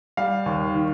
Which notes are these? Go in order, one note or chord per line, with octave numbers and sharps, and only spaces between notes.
G3 F5
D#2
D#3